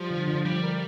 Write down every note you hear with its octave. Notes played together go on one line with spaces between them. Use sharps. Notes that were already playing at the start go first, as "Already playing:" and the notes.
Already playing: F3 G3
D3
D3
F3 G3
A#4